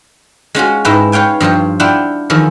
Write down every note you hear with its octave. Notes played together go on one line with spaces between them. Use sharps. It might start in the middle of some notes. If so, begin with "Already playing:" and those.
G#3 C#4 F4 F#4
G#2 E4 B4 D#5 G5 A#5
B4 C#5 F5 G5 G#5
G2 F3 C5 C#5
D4 E4 F4 F#5 G5
E2 D#3 F3 G#4 A4